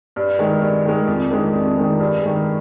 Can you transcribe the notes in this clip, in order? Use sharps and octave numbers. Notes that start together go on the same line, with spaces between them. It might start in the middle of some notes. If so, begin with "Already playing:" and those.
G2
D#3 G#3
G2
D#3 G#3
F2
D#3 G#3 D4
F2
D#3 G#3 D4
G2
D#3 G#3